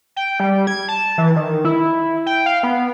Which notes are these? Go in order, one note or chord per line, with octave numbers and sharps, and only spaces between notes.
G5
G3
G#6
A5
E3
D#3
E4
G5
F5
B3